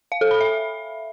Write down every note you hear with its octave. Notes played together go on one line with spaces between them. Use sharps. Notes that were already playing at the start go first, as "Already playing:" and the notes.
F5
A4
B5
E5